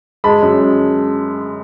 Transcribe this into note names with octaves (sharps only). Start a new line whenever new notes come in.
G#3 A5 B5
F#2
G#3